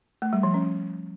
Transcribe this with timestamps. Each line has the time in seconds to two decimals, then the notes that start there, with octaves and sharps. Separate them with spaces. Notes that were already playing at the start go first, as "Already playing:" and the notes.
0.22 A3
0.33 G3
0.43 F3
0.54 C#4